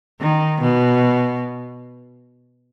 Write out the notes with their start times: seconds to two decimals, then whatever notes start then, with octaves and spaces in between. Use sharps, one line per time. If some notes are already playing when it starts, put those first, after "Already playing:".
0.21 D#3
0.62 B2